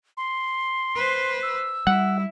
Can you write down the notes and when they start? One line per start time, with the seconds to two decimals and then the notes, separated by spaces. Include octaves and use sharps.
0.17 C6
0.95 B4 C5
1.43 E6
1.87 G3 E4 F#5